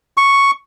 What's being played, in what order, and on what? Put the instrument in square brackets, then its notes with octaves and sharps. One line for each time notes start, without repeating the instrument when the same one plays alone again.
[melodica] C#6